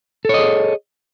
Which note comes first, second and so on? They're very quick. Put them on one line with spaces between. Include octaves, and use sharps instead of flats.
A4 C#5 D#5 G#4